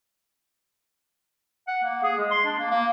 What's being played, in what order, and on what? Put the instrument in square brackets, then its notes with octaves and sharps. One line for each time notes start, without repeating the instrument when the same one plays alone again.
[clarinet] F#5
A#3
G#4
G#3
C6
D4
A#3
A#3